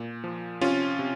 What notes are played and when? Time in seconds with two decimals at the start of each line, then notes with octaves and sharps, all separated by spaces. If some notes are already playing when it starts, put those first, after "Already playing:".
Already playing: A#2
0.24 F3
0.61 C3 C#4 F4
0.99 C3